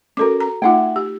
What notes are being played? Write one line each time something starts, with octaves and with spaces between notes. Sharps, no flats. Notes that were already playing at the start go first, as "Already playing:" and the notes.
C#4 F#4 A4 A#4 D6
A#5
A3 D#4 F4 E5 F#5 G5
G4